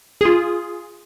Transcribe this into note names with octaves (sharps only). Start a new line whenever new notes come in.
F4 G#4